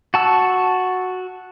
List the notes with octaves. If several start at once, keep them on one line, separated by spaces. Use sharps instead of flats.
F#4 A5 E6